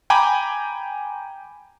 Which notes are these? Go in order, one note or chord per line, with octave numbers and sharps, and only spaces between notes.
G5 G#5 A#5 B5 D6